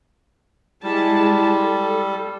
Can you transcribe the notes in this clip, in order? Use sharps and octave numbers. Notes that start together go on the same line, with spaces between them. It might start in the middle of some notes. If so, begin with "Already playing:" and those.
G3 G#3 E4 A5
A4